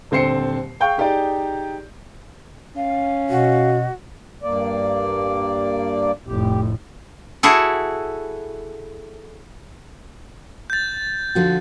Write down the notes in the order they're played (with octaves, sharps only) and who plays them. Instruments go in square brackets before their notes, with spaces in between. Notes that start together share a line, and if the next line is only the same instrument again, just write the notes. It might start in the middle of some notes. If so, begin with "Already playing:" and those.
[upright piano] D#1 D3 C4 C5 C7 C#7
G#4 F5 G5 C#6 G6
D#4 G4 G#4 D5
[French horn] C#4 [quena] F5
[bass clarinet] B2 [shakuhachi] F#4
[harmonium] G2 A#3 D5
[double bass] F1 A2 [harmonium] G4
[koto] E4 F#4 G#4 A4
[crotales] G6 A6
[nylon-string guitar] D3 F3 F#4